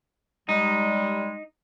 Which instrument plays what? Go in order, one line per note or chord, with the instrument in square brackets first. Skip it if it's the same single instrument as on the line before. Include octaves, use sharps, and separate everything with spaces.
[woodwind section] G3 G#3 [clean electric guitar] D#4